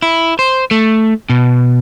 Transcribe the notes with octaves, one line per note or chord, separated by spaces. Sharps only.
E4
C5
A3
B2